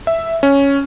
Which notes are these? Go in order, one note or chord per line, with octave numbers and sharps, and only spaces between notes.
E5
C#4